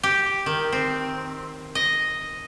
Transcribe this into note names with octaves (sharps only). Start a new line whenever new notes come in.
G4
D#3
C4
D#5